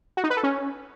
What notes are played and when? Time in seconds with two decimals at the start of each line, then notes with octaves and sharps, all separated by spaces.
0.17 F#4
0.24 D#4
0.30 B4
0.37 A4
0.43 C#4